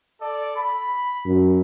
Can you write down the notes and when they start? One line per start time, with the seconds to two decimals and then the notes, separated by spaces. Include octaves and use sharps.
0.20 A4 D5
0.55 B5
1.25 F#2